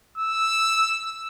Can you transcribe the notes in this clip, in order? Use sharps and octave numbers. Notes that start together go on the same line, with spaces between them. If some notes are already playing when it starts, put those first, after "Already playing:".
E6